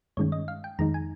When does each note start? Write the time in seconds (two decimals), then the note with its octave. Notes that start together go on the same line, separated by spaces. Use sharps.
0.17 G2 D#3 G#3 C#4 C#5
0.32 D#5
0.48 F5
0.64 G5
0.79 F2 D#3 G#3 D#4 A#5
0.94 G#5